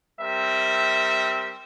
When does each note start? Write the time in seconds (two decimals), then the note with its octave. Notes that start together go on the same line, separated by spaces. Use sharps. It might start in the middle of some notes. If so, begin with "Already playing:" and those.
0.20 G3 C4 A#4 E5